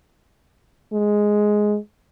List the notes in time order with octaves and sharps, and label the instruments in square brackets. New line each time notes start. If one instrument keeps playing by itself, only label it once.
[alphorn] G#3